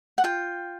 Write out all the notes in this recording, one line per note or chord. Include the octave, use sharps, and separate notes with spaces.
F#5
F4 G5